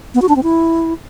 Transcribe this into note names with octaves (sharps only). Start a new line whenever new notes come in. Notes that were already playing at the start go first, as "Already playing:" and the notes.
B3
F#4
D4
C4
E4